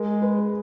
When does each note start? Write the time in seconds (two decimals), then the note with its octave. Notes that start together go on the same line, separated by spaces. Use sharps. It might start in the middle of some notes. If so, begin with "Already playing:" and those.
Already playing: G#3 A#4
0.22 B4